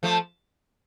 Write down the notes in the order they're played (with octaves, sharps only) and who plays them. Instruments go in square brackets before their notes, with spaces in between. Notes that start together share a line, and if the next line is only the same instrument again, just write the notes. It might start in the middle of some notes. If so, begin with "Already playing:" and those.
[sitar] F3 A3